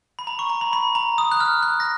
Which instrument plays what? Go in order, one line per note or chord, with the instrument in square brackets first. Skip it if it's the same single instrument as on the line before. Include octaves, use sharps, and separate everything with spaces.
[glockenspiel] B5
A#5
C#6
A#5
B5
B5
A#5
D#6
F#6
F6
F#6
A#6